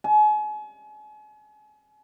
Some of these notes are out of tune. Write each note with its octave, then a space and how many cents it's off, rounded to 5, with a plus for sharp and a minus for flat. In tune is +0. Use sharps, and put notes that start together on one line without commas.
G#5 +40